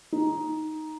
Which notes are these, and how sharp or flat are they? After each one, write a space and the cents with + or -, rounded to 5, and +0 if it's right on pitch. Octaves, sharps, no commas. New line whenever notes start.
D#4 +5